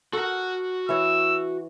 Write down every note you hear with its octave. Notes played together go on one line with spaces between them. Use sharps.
F#4 A4 A#4 F#5
E3 C#5 E6